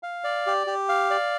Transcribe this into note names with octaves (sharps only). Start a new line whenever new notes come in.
F5
D5
G4
G4
F5
D5